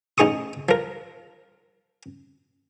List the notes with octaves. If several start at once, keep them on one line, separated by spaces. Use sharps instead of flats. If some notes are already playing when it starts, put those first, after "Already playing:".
A1 D#4 G#4 C#6 D#6
F3 A#4